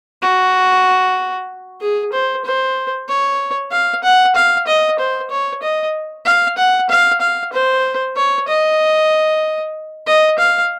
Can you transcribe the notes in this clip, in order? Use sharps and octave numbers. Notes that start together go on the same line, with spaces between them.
F#4
G#4
C5
C5
C#5
F5
F#5
F5
D#5
C5
C#5
D#5
F5
F#5
F5
F5
C5
C#5
D#5
D#5
F5